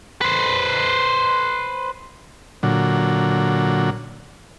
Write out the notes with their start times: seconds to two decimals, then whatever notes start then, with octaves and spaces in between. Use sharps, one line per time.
0.21 B4 C5
2.63 A#2 D3 F#3